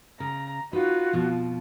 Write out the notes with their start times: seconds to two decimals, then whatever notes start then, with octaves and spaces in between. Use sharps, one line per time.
0.20 C#3 A#5
0.73 D#4 F4 F#4 B4
1.13 F2 B2 F3